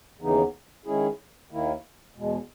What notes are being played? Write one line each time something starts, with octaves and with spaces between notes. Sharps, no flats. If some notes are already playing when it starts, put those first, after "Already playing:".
D#2 C#3 E3 B3 D#4
D#3 G#3 C#4 E4 G#4
D#2 D#3 A#3 E4
E2 B2 G#3